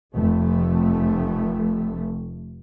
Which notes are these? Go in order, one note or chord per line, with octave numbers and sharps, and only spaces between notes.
F1 A3